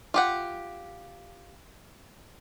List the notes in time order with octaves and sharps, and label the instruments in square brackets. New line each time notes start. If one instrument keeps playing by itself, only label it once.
[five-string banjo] F4 G4 F#5